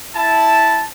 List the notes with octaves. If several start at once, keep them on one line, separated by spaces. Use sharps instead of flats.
E4 A5